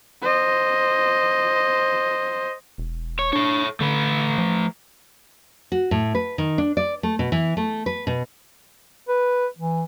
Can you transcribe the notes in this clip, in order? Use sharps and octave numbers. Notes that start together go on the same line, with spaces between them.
C5 D#5
E1
C#5
D4 A4 C#5
D3 A3 B4
F3
F#4
A2
B4
D#3
D4
D5
A3
B2
E3
A3
B4
B2
B4
E3